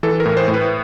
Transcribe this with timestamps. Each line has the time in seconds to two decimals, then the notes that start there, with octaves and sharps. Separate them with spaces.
0.03 E3 A4
0.20 A#4
0.26 A2
0.37 C5
0.48 A2
0.54 B4